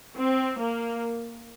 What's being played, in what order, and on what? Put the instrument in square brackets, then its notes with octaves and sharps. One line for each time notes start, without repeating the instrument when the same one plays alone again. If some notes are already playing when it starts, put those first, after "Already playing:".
[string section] C4
A#3